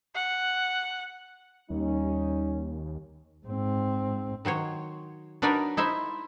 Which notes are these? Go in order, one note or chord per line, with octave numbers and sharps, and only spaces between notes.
F#5
D#2 G3 C#4 D#4
G#2 C4
D#3 F#3 C5 C#5
F#3 D4 D#4 A#4 B4 D5
D#4 E4 C5 E5